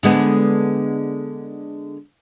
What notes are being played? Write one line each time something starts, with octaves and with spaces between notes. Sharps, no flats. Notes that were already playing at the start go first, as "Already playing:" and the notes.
D3 G#3 B3